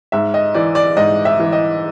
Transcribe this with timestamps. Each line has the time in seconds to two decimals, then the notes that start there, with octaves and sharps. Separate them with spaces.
0.12 G#2 E5
0.34 D#5
0.54 E3 D5
0.75 D5
0.96 G#2 D#5
1.25 E5
1.40 E3
1.52 D#5